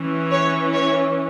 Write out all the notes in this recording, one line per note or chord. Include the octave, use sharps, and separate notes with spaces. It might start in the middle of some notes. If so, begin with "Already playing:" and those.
Already playing: E3 C#4
C#5
C#5